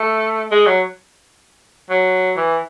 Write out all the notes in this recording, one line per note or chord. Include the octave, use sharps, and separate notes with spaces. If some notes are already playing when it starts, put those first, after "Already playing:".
Already playing: A3
G#3
F#3
F#3
E3